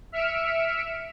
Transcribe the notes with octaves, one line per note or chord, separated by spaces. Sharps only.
E5 F6 B6 C#7 D7 E7